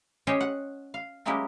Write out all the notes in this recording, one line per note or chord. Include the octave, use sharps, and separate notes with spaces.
C#4 G4 C5 C#5 D#5
F#5
F5
F#3 G#3 A#3 C#4 E4 G4